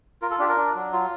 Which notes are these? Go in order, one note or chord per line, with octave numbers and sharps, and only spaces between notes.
F4 A#4
A4
D4 G4
A#4
D4
F#3
F4